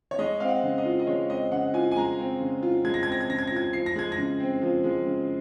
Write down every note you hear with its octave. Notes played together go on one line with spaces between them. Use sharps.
C#5
G#3 D#5
C4 F5
F#5
C#3
D#5
F4
D#5
G#3 C#5
C4 D#5
C#3 F#5
F4 G#5
G#5
G#3 A#5
C4
C#3
F4
G#3 G#6
A#6
G#6
C4 A#6
G#6
C#3 A#6
G#6
F4 A#6
G#6
F3 C7
A#6
G#3 G#6
A#6
C#3
C4
F3
G#3
C#3